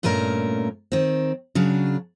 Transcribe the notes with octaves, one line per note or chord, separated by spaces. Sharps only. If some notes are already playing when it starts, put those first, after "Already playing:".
G2 A#2 A3 C#4 A#4
D#3 C4
C#3 F#3 D4